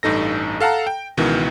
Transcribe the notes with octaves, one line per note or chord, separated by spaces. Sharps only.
A1 G2 D#4 A4 A#6
A4 F5 F#5 A5 A#5
G5
C#2 B2 D#3 E3